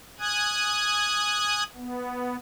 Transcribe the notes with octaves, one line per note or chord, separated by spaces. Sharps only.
G#5 D#6 F#6 G#6
B3